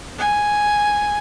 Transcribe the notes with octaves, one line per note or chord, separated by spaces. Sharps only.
G#5